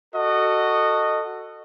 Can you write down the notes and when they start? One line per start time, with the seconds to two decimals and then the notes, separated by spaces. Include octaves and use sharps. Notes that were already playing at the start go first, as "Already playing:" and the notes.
0.15 F#4 A4 D#5